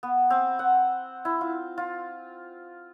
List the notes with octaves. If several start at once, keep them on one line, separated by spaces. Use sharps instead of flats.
B3
C4
F#5
E4
F4
F4